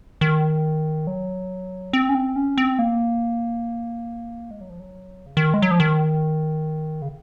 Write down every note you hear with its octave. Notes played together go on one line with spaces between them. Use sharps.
D#3
F#3
C4
C#4
C4
C#4
C4
A#3
G#3
F#3
F3
F#3
C#3
D#3
G#3
F#3
F3
D#3
C#3